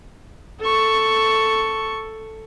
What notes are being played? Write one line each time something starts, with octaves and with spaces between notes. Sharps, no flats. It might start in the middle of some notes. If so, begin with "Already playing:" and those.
A4 C#6